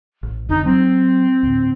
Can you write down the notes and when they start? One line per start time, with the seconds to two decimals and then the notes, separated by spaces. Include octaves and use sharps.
0.23 A1
0.49 E1 F2 D3 D#4
0.65 F#3 C4
1.43 D2 A2